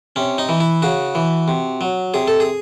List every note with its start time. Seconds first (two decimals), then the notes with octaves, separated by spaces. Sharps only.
0.16 C3 C#4
0.38 D#4
0.49 E3
0.60 E4
0.82 C#3 F#4
1.15 E3
1.48 C3
1.81 F#3
2.14 C3 G#4
2.28 A4
2.40 G#4